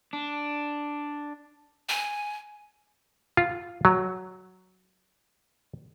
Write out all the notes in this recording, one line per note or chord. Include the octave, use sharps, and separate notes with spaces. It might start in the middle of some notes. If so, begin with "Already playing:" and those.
D4
G#5
F4
F#3